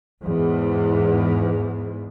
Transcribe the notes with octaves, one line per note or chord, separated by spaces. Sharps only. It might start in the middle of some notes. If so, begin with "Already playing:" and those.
E2 G#2